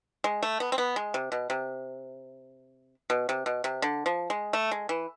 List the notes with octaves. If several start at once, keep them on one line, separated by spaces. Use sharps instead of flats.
G#3
A3
B3
C4
B3
G#3
C3
B2
C3
B2
C3
B2
C3
D3
F3
G#3
A3
G#3
E3